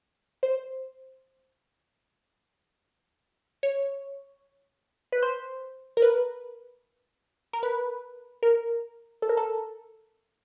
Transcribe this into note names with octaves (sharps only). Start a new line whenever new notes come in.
C5
C#5
B4
C5
A#4
B4
A#4
B4
A#4
A4
A#4
A4